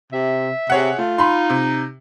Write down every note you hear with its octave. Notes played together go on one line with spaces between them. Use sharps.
C3 E5
C3 G#4 C#5 F#5
A3 F4
D#4 B5 C6
C3